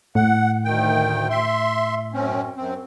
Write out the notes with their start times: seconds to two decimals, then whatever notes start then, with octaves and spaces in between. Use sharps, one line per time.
0.15 A2 F#5
0.64 D2 D#3 G5
1.30 E5 C6
2.13 F#2 C4 C#4
2.57 F#2 C4